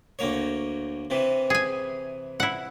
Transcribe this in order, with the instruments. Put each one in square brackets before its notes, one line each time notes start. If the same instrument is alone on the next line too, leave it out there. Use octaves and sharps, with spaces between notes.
[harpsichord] D2 A#3 C#5
C3 E3
[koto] G#4 G#5
E4 F#5